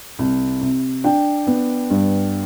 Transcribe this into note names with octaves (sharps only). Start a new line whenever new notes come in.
C2
C3
D4 G5
B3
G2